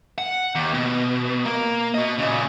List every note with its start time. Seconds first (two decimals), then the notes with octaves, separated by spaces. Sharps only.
0.18 F#5
0.55 D#2
0.74 B2
1.45 A#3
1.94 F#4 D#5
2.18 A#2 C#3